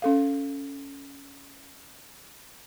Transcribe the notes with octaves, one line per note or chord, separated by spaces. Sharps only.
C#4 A4 F5